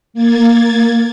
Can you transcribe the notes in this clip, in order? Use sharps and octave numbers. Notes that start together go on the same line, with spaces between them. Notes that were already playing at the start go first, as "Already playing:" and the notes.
A#3 G#6 A6